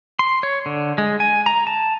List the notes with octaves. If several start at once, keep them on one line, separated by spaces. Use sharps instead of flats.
C6
C#5
D3
G#3
G#5
A#5
A5